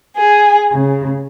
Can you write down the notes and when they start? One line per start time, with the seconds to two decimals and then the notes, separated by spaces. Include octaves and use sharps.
0.15 G#4
0.72 C#3